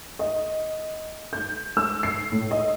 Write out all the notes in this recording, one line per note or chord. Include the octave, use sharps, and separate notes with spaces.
D#5
G6
E6
C7
A2
D#5